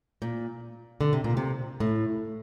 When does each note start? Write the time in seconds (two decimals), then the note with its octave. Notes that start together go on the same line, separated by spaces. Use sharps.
0.22 A#2
1.01 D3
1.13 C3
1.24 A#2
1.37 C3
1.80 A2